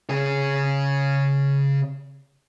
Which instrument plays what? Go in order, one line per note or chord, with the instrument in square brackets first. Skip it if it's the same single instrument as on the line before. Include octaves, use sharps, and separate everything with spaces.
[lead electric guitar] C#3 G#4